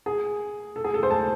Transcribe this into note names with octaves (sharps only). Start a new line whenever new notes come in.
G#4
A4
G#4
A4
C5
A5